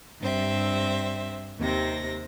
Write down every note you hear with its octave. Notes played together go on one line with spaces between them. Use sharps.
G2 C4 E5
D#2 C3 C4 A#6